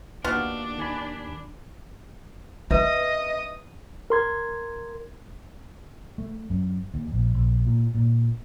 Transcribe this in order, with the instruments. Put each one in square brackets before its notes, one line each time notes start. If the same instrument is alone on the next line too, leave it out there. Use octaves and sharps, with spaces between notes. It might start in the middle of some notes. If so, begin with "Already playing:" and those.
[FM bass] D#2 [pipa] B3 F4 F#4 [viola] D4
[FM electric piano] D#3 G#5 B5
[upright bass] D4 [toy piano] B4 E5 [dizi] D#5 [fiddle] D#6
[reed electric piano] A#4 C6 G#6
[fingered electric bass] A3
F#2
D#2
A#1
A#1
A#2
A#2